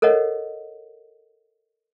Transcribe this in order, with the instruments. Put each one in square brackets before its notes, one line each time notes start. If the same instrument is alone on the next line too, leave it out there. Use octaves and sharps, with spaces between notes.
[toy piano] A4 A#4 C#5 D#5 F#5